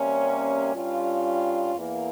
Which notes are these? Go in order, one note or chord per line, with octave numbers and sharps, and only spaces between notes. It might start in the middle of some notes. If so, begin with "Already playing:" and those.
Already playing: C3 G3 A#3 C#4
G2 G3 C#4 F4
E2 E3 A#3